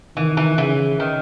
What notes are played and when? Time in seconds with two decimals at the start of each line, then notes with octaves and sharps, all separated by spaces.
0.16 D#3 E3
0.37 E3
0.58 C#3 E3
1.00 D#3